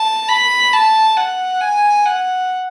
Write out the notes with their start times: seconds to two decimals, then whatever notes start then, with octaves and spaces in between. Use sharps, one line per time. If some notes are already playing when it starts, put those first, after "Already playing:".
Already playing: A5
0.29 B5
0.73 A5
1.17 F#5
1.61 G#5
2.06 F#5